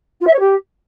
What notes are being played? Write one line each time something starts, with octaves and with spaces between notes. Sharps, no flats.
F4
E5
C#5
G4